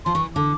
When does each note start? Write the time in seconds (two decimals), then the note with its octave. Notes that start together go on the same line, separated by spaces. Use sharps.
0.05 F3 C6
0.15 E3 C#6
0.36 D3 D6